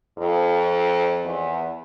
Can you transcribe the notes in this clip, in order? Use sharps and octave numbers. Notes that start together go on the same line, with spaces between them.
F2
E2